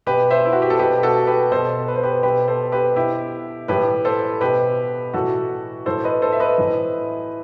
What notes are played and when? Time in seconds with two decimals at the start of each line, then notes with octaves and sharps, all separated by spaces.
0.06 B2 G4 B4
0.30 C5 E5
0.45 E4
0.53 F#4
0.62 G4
0.70 A4
0.78 B2 G4 B4
1.03 F#4 A4
1.27 G4 B4
1.51 B2 A4 C5
1.88 B4
1.96 C5
2.03 G4 B4
2.23 B2 G4 B4
2.48 A4 C5
2.72 G4 B4
2.96 B2 E4 G4
3.68 A2 E3 G4 B4
4.05 A4 C5
4.41 B2 G4 B4
5.14 A2 E3 F#4 A4
5.86 A2 E3 A4 C5
6.04 B4 D#5
6.22 A4 C5
6.32 E5
6.40 B4 D#5
6.58 A2 E3